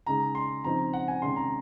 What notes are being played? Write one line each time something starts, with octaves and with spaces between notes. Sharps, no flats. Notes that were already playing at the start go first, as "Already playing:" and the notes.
C#3 G#3 D#4 A#5
C6
C#3 F3 C4 D#4 A#5
F#5
G#5
C3 D#3 G#3 C#4 C6
A#5